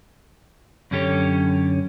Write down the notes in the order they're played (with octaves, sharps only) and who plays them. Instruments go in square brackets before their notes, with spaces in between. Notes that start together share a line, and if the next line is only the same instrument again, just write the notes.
[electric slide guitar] F#2 D3 C#4 G4 A4 C#5